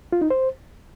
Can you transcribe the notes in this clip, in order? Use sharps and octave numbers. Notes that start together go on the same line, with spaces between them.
F4
D#4
C5